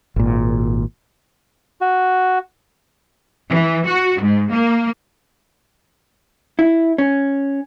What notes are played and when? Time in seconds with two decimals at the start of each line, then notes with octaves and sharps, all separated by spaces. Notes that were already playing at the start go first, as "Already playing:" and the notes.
0.16 G#1 A#2
1.81 F#4
3.50 E3
3.87 F#4
4.20 G#2
4.51 A#3
6.59 E4
6.98 C#4